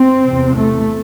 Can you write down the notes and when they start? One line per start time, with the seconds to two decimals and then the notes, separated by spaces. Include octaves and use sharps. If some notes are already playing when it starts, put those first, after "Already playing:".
Already playing: C4
0.24 E2 C3
0.57 A3